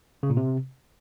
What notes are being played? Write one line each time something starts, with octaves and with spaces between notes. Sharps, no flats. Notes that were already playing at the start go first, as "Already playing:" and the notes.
C#3
A#2
C3